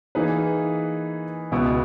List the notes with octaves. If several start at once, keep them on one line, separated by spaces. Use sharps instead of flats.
E3 A#3 D#4 G#4 B4
C#2 B2 G#3 B3 E4